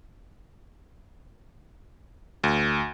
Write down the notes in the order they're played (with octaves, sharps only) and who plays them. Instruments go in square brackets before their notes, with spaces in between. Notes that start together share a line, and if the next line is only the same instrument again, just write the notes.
[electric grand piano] D2